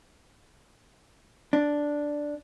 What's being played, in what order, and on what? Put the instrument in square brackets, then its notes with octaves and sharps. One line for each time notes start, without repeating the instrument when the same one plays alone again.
[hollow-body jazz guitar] D4